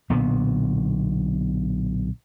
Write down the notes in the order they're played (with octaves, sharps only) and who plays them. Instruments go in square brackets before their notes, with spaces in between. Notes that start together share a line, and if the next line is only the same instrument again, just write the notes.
[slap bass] B1 A#2 D3 B3